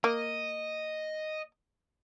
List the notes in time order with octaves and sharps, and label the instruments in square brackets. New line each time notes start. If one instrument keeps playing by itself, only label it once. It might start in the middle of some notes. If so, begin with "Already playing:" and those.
[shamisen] A#3 [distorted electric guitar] D#5